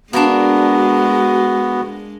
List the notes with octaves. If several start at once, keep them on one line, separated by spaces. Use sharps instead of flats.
G#3 A#3 B3 D4 F#4